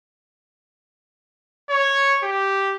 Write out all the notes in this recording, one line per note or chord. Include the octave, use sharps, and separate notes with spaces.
C#5
G4